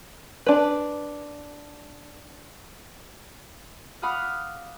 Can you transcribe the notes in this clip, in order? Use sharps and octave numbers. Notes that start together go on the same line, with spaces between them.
D4 B4
F5 F#5 B5 D6 D#6 F6